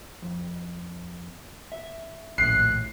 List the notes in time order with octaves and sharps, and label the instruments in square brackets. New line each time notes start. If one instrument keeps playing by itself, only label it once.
[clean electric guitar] F2
E5
[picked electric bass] A#1 D#2 A2 [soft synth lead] F#6 [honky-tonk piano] C7